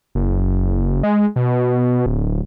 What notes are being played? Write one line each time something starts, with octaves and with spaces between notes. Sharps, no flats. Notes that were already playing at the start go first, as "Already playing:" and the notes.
F#1
G#3
B2
D1